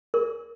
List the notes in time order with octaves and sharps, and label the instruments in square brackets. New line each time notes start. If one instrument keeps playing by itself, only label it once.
[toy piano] A#4